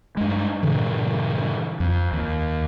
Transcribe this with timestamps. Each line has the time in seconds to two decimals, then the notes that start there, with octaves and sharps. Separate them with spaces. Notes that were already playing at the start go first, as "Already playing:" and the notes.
0.17 G2 G#3
0.63 G2 A#2 C#3 E3
1.80 F2
2.13 D#2